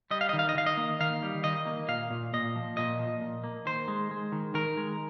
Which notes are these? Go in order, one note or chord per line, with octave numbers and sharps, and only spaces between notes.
G3 D#5
F5
D#3 D#5
F5
D#5
D#3 F5
D#5
A#3
D#3 F5
G3
D#3 D#5
A#3
A#2 F5
A#2
A#2 D#5
F3
A#2 D#5
F3
A#2
A#3
D#3 C5
G#3
G#3
D#3
D#3 A#4
G#3